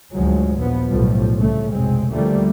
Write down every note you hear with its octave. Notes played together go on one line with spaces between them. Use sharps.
D2 G#2 F3 F#3 G#3
A#1 D#2 F3 B3
B1 A2 F3 G3
C2 C#3 A3
F1 B1 G#3 C4
D2 F3 G3 A3 A#3